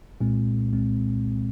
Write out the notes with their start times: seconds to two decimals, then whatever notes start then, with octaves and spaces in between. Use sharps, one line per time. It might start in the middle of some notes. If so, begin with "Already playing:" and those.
0.21 C2 A#2 G#3 C4
0.72 C2 A#2 G#3 C4